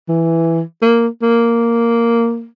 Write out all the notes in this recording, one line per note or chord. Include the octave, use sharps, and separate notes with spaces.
E3
A#3
A#3